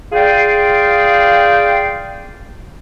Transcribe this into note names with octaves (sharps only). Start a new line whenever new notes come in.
F4 G#4 D5 F5 G5